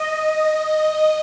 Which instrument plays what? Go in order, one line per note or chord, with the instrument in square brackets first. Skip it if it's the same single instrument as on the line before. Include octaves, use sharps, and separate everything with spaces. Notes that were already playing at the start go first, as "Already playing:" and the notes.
Already playing: [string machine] D#5